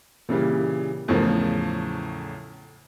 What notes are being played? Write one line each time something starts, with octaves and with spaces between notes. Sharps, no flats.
A#2 C#3 E3 G3
E2 A2 C#3 F3 A#4